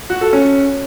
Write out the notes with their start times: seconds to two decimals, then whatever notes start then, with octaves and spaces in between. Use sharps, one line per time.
0.10 F#4
0.21 A4
0.33 C#4